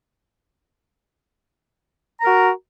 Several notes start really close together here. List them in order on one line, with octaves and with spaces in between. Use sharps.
A#5 A#4 F#4